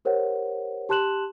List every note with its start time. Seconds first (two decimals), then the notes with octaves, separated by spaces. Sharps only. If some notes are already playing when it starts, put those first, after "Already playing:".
0.05 G4 A#4 C5 C#5 F#5
0.89 G4 A5 C6 F#6 E7 F#7